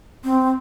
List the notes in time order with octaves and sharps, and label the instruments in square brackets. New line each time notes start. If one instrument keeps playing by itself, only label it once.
[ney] C4